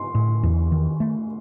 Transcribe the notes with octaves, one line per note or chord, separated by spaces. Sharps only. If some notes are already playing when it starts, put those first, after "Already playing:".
Already playing: C6
A2
E2
D#3
A3